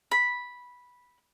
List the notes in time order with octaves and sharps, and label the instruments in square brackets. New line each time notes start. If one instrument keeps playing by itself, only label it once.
[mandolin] B5